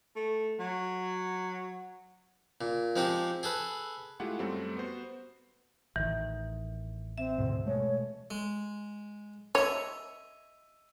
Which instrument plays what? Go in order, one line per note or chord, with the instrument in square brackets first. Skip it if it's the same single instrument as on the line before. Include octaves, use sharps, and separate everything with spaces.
[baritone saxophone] A3
F#3
[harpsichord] A#2
F3 G#3 C4 D#4 G4
G#4 A4 B4
[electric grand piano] G#3 A3 E4 F4 G4 F#5
F#2 G3 A3 C4
B3 F#4 C5
[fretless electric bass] A1 D#3 [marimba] E3
[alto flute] C4 [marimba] E5
[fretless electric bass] D2 G#2 B2
[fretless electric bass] B2 G#3 A3 [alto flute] C#5
[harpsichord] G#3
[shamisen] C#5 [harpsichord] D#5 E5